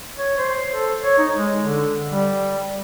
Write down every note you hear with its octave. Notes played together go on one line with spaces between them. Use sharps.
C#5
C5
A4
C#5
D#4
G#3
D3
G3